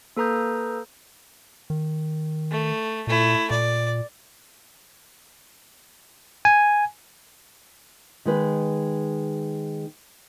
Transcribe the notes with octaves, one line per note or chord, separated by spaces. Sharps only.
A#3 A4 B4 A#5 D#6 G6
D#3
A3
A#2 A3 E4
A#2 D5
G#5
D#3 G#3 B4